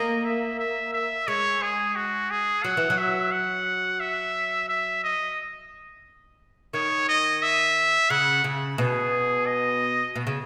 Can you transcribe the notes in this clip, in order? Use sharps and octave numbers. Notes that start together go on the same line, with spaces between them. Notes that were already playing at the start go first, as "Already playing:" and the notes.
Already playing: A#3 D#5
E5
E5
E5
G#3 C#5
G#4
F#4
G#4
F#3 F#5
E3
F#3
E5
F#5
E5
E5
D#5
D#3 C#5
D#5
E5
C#3 F#5
C#3
B2 G#4
D#5
B2
C#3